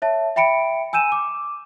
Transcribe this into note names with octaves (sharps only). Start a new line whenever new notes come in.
C#5 E5 A5
E5 G5 B5 C#7 D7
G#5 E6 G6 D#7 E7
D6